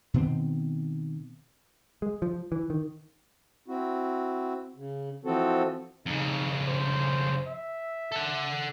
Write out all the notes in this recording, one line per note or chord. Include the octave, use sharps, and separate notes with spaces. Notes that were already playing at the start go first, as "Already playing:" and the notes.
B2 D#3 B3 C4
G#3
F3
E3
D#3
C4 E4 F#4
C#3
E3 F3 C4 F#4 A4
F2 C#3 D#4
C5
E5
A4 F#5